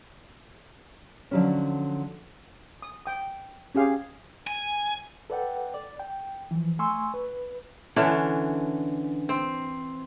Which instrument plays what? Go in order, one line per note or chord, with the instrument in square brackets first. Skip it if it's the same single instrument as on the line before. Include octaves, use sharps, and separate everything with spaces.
[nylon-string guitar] D3 F3 F#3 A3 C#4
[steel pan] D#6
G5 D#6
C#4 G4 G#4 F5
[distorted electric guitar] G#5
[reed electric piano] A4 B4 D5 F#5 G5
D5
G5
E3 F3
A3 G#5 C6 C#6 E6
B4
[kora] D3 E3 C#4 D4
C4